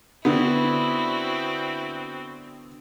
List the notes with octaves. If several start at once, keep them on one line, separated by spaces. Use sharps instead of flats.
D3 B3 C4 E4 F#4